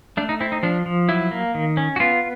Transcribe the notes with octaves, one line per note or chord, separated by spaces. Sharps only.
A3 D4
D#4
C4 E4
D#4
F3 D4
F3
F#3 E4
A#3
D#3
C#4
F#4
B3 F4